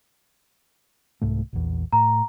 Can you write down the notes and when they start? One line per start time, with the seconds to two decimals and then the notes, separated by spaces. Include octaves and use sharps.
1.22 C2 G#2 A3
1.53 A#1 E2
1.93 A2 A#5